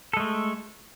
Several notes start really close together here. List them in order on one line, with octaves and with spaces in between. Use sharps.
A4 G#3 A3